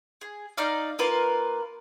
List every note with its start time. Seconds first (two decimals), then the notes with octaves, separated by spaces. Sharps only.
0.21 G#4
0.57 D#4 D5 F5
0.99 A#3 F4 A#4 B4